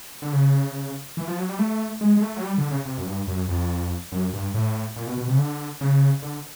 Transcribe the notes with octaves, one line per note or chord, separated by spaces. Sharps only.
D3
C#3
E3
F3
F#3
G3
A3
G#3
G#3
A3
F#3
G3
D3
C#3
C3
F#2
G2
F#2
F2
F#2
G2
A2
A#2
B2
B2
C3
C#3
D3
C#3
D3